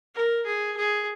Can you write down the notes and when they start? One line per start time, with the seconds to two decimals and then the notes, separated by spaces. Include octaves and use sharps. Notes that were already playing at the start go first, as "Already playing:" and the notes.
0.15 A#4
0.46 G#4
0.77 G#4